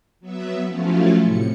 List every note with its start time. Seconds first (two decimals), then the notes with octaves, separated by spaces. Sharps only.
0.20 F#3 B3 E5
0.66 F3 F#3 A3 C#4 E4 F4
1.23 A2 C3 C#7